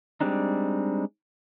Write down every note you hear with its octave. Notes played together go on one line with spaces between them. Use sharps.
G3 G#3 C4 D4 D#4